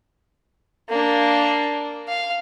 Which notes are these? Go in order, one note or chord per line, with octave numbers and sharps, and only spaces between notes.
A#3 D4
F5